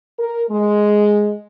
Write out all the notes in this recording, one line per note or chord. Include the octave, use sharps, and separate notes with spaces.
A#4
G#3